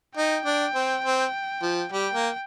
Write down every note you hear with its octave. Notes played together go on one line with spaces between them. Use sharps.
D#4 G5
D4
C4
C4
F3
G3 G5
A#3